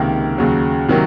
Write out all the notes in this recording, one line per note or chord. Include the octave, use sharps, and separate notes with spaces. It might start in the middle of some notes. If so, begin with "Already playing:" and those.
Already playing: C#2 C3 D#3 A#3
D#2 C#3 F#3
C3 D#3 F#3 A#3